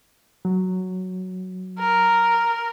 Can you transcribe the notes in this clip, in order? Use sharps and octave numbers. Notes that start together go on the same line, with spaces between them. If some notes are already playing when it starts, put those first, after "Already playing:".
F#3
A#4